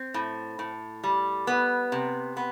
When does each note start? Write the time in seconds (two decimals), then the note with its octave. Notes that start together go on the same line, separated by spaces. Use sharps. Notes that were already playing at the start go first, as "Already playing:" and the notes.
Already playing: C4
0.14 A2
0.59 A2
1.04 G3
1.47 B3
1.92 C3
2.37 B3